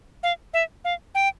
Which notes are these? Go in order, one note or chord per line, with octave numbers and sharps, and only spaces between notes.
F5
E5
F5
G5